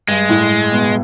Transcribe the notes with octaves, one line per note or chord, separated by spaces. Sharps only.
G2 G#3
A2
B2